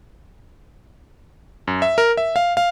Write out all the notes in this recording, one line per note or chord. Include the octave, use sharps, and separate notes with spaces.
F#2
E5
A#4
E5
F5
F5